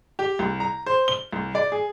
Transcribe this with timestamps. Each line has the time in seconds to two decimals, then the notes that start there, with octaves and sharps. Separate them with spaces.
0.19 G4
0.39 C2
0.60 A#5
0.86 C5
1.08 G7
1.33 C2
1.55 D5
1.72 G#4